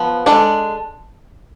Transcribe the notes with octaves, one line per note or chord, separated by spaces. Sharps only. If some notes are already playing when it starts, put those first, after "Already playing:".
Already playing: F3 B3
G#3 D4 A4 D5